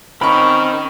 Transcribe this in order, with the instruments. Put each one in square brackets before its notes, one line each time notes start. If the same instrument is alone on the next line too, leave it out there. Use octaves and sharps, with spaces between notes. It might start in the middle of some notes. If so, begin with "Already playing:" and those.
[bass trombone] D#3 [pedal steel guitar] C4 C#4 A#4 [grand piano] B5 C#6